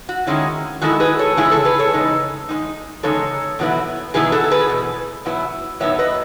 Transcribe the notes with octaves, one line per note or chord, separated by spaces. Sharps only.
F#4
D#3 G#3 C#4 E4
D#3 G#3 C#4 E4 F#4 A4
G#4 B4
A4 C#5
E2 C#3 G#3 E4 G#4
A4 C#5
G#4 B4
A4 C#5
E2 C#3 G#3 D#4
E2 C#3 G#3 D#4
E2 C#3 G#3 D#4 A4 C#5
E2 B2 F#3 B3 E4
E2 B2 F#3 B3 E4 G#4 B4
F#4 A4
A4
G#4 B4
E2 B2
E2 B2 F#3 B3 E4
A2 F#3 B3 D#4 C#5 E5
B4 D#5